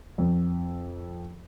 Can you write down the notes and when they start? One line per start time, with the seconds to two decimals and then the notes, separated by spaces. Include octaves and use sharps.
0.18 F2